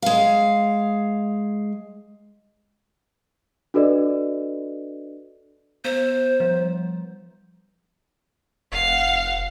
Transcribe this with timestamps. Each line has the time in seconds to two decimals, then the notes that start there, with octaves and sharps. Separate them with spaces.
0.02 G#3 F5
3.74 D4 F#4 A4 B4 D5 D#5
5.85 B3 C5
6.40 F3 G3
8.72 F1 F5 F#5